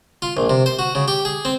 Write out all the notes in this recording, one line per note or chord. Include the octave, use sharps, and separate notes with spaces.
F4
A#1
C3
C5
F#4
C#3
G4
G#4
C4